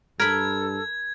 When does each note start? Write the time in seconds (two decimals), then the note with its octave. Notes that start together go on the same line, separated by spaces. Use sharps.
0.20 G2 A4 A#4 B5 G#6